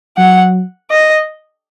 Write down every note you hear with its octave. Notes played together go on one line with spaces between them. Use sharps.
F#3 F#5
D#5